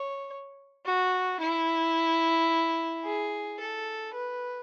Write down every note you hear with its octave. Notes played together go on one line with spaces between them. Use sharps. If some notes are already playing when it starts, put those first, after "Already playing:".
Already playing: C#5
F#4
E4
G#4
A4
B4